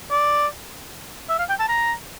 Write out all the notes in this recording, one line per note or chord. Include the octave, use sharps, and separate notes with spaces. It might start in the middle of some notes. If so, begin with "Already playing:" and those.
D5
E5
F5
G5
A5
A#5